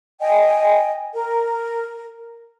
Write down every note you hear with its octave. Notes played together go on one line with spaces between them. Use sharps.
D#5 G5 G#5
A#4